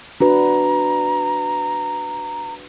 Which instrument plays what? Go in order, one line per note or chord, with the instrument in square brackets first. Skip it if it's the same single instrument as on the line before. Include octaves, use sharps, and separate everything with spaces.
[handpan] D4 F#4 B4 [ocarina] A#5